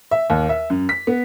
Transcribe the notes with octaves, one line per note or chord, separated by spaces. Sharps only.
E5
D#2
E5
F#2
B6
B3